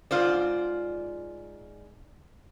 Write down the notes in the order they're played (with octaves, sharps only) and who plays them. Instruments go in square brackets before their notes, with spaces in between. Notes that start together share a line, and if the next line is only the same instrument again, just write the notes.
[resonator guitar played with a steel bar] G#2 F4 C5 D5